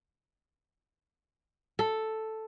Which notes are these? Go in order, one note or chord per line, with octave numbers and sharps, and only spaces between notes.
A4